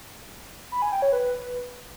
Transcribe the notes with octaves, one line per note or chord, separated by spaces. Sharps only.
B5
G#5
G5
C#5
B4